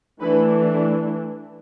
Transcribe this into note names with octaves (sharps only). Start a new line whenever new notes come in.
E3 A3 D4 B4